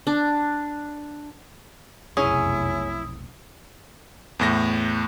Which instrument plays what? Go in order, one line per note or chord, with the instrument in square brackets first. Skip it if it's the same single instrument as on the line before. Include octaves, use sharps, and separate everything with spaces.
[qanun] D4
[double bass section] F1 B1 F#2 [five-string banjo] C#4 G#4 [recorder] E4 [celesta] D#6
[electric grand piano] E2 A2 A#6